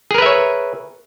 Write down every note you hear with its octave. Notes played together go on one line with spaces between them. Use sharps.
G#4 A#4 B4 C#5 E5